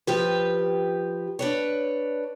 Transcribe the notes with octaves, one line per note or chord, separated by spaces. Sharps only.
F3 G4 B4
D4 B4 C#5